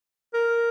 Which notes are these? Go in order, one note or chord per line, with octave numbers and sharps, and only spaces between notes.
A#4